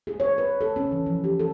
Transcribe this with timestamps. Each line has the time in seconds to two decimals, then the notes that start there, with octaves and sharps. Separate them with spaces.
0.07 G#4
0.20 C#5
0.38 B4
0.61 A4
0.76 C#4
0.91 E3
1.06 F3
1.24 G4
1.40 A4